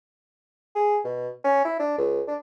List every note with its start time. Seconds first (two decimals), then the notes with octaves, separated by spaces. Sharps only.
0.75 G#4
1.04 B2
1.44 C#4
1.65 E4
1.80 D4
1.98 C#2
2.28 D4